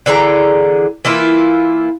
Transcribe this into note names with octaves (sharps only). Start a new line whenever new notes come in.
D3 E3 G#4 A#5
E3 A#3 E4 F4